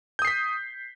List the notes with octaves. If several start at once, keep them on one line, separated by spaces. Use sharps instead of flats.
D#6 G6 B6 C7